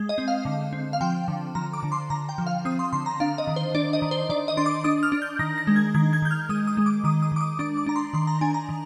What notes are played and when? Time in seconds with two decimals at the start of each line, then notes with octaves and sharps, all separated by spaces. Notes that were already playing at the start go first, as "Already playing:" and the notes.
Already playing: G#3
0.09 D#5
0.18 C4
0.28 F5
0.45 D3
0.73 C4
0.93 F5
1.01 F3 G5
1.28 D3
1.55 F3 A#5
1.73 D6
1.83 D3
1.92 C6
2.10 D3 A#5
2.29 G5
2.38 F3
2.47 F5
2.65 C4 D#6
2.79 C6
2.93 D3 C6
3.06 A#5
3.20 D4 F5
3.38 D#5
3.47 D#3
3.56 C5
3.75 D4 D5
3.93 D#5
4.02 D#3
4.11 C5
4.29 D#3 D5
4.48 D#5
4.57 D4 C6
4.66 D6
4.84 D4 D#6
5.03 F6
5.12 D4
5.22 G6
5.39 D#3 A#6
5.58 A#6
5.67 G#3
5.76 G#6
5.95 D#3 G#6
6.13 G#6
6.22 D#3 G6
6.31 F6
6.49 G#3 D#6
6.67 D#6
6.77 G#3
6.86 D6
7.04 D#3 D#6
7.22 D#6
7.32 D#3 D6
7.41 D#6
7.59 D4 D6
7.77 D6
7.86 D4 A#5
7.96 C6
8.13 D#3 C6
8.27 A#5
8.41 D4 G#5
8.54 A#5
8.69 D#3